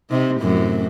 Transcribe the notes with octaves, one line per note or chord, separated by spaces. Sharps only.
C3 D#4
F#2 A2 C3